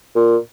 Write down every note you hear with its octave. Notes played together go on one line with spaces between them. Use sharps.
A#2